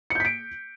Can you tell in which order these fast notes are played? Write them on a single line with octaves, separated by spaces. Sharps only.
C#7 G6 B6 D7